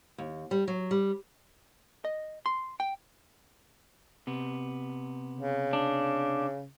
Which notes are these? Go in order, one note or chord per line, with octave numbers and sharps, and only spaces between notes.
D#2
G3
F#3
G3
D#5
C6
G5
C3 B3
C#3
D4